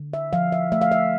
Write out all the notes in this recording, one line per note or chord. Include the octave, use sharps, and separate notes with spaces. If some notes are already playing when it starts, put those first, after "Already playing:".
Already playing: D3
E5
F3 F5
E5
A3 E5
F5
E5